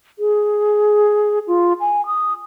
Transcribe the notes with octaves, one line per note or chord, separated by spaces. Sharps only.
G#4
F4
G#5
D#6